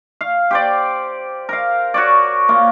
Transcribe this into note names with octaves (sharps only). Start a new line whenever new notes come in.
F5
G4 C5 D5
A#4 F5
F#4 C#5 D5
A#3 F4